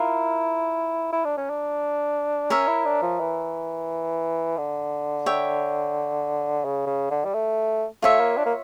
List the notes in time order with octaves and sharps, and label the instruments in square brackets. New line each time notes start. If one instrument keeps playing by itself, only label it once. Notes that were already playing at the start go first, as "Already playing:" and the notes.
Already playing: [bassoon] E4 [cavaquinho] F4 A#4
[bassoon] E4
D4
C#4
D4
[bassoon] C#4 [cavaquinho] A#4 C#5 E5
[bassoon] E4
D4
F3
E3
D3
[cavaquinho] C#5 E5 G5
[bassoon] C#3
C#3
D3
G3
A3
[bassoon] A3 [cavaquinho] F4 C#5 E5
[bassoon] A#3
D4
A#3